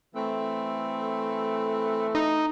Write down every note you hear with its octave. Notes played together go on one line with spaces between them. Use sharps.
E3 A3 C4
D#4